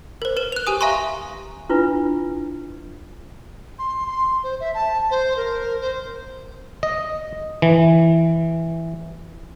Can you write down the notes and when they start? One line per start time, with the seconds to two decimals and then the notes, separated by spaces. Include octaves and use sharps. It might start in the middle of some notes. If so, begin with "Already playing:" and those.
0.22 A#4 C5
0.37 B4 E7
0.52 F#6 F7
0.67 G4 G#5 D#6
0.81 E5 F5 G#5 A#5 C6 C#6
1.69 D4 E4 F4 B4
3.79 C6
4.07 C6
4.44 C5
4.60 E5
4.75 A5
5.11 C5
5.37 A#4
5.81 C5
6.83 D#5
7.62 E3